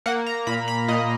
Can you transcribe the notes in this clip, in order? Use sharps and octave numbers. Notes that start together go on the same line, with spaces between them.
A#3 F#5
A#5
A#2 B5
B5
A#2 D#5